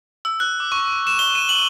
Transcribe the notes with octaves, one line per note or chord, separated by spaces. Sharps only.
E6
F#6
D6
C#6
E7
G7
D#7
F#7